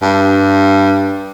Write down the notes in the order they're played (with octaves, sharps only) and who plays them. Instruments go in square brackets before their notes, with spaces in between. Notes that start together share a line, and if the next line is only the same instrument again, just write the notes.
[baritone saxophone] G2